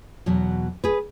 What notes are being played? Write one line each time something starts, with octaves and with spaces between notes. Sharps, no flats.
E2 B2 F#3
G#4 B4